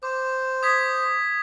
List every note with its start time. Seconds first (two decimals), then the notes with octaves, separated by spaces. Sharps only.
0.03 C5 D6
0.63 D#6 G#6 B6